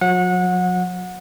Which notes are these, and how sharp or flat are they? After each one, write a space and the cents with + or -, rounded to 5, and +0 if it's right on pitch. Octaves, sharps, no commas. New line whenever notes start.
F#3 -40 F#5 -25